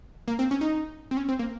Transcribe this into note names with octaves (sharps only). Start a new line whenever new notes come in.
A#3
C4
C#4
D#4
C4
C#4
C4
A#3